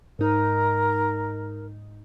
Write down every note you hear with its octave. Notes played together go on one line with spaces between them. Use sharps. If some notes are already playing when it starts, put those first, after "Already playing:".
G#2 D#4 A#4